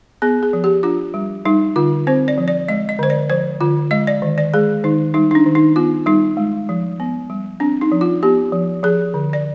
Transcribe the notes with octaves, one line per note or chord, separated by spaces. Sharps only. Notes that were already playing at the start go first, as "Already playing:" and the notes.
B3 G#4
G#4
F3
G4
D4 F4
G3
G3 D#4
D3 F4
C4 C5
D5
F3
D5
G#3 D#5
D#5
D3 C5
D5
F3 C5
D3 F4
G#3 D#5
D5
D#3
D5
G#3 G#4
D#3 D#4
G3 D#4
D#4
D4
D#3
D#4
B3 F4
G3 D#4
G#3
F3
B3
G3
C4 D4
D#4
F3
F4
B3 G4
F3
F3 G#4
D3
D5